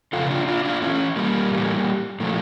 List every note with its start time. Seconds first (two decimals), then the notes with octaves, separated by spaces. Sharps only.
0.13 C#3 F3 F4 A4
0.30 D4 F4
0.47 D4 F4
0.65 D4 F4
0.82 A2 E3 C#4 E4
1.16 G3 A#3
1.51 A2 E3
2.20 A#2 F3 A3